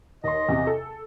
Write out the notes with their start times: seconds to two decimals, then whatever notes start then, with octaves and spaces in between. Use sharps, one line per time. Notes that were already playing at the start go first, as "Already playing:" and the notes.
0.24 D#2 D#5 C6
0.49 E2 C3
0.67 A4